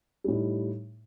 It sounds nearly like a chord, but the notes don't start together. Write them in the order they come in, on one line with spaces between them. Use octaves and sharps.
G3 A2 D#4